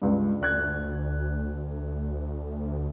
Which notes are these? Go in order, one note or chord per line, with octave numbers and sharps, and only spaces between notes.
C#2 G2
D2 D5 F#6 G#6